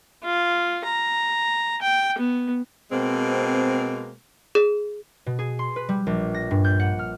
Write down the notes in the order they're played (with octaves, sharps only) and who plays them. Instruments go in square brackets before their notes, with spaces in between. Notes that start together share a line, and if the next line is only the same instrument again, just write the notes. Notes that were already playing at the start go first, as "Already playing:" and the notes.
[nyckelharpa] F4
A#5
G5
B3
[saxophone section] B2 G#3 A#3 C4
[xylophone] G#4
[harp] B2
G#4
C6
B4
G3
A#1
A#6
G2
G6
F#5
F6